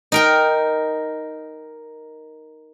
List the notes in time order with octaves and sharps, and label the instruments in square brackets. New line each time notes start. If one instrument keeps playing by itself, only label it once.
[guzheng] D#4 A#4 G5